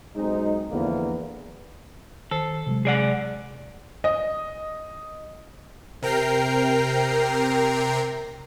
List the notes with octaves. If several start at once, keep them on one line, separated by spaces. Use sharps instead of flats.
B1 G#3 C4 D#4
E2 D3 F3 A#3 B3
D#3 A4 C5 C7
C3 F#3 G#3
G#4 D5 F#5
D#5
C3 A#4 G5 A#5 C7